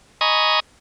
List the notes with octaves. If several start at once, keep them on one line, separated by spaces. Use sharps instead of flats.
D#5 G#5 A#5 B5 C#6 D#6